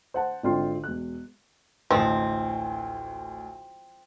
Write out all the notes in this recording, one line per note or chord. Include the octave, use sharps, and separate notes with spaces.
C5 F#5 A5
G#1 D3 C4 F4 C6
E1 F#6
A1 D2 F3 G#3 C4